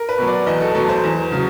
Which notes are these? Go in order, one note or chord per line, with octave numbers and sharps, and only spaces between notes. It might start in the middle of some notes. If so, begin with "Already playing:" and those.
Already playing: A#4
B4
B2 F#3
D5
E2 D#5
A4
B2 F#3 A4
C5
E2
C#3 F#3